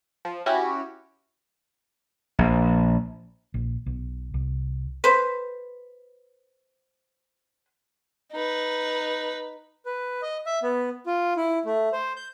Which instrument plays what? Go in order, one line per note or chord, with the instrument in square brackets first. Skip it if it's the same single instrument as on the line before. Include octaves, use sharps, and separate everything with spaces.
[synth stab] F3
C#4 E4 F#4 G4
[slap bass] A#1
[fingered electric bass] A#1
B1
C2
[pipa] B4 C5
[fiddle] D#4 B4
[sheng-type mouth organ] B4
D#5
E5
B3
F4
E4
A3
C5
G6